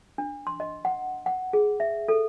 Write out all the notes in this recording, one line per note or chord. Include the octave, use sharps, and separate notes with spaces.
D4
C6
D#5
F#5
F#5
G#4
E5
A4